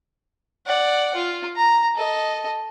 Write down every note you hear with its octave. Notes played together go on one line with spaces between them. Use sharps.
D5 F#5
F4
A#5
A4 D#5